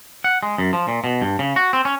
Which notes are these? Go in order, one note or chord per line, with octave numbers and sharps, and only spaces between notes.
F#5
G#3
F#2
F3
A#2
B2
G2
C#3
F#4
C4
C#4